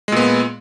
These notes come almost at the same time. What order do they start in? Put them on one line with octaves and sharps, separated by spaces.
G#3 A#2 B3